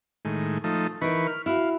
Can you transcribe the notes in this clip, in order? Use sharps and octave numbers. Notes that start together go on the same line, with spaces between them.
A2 D#3 G#3
F3 A3 D#4
E3 D#4 A#4 B4 C#6
F6
E4 F#4 F5